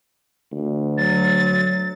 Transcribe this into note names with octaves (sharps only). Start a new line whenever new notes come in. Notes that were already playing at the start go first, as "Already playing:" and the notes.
D2
F#3 A6